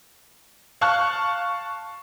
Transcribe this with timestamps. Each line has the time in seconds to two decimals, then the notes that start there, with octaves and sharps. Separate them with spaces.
0.81 F5 A5 C#6 F6 F#6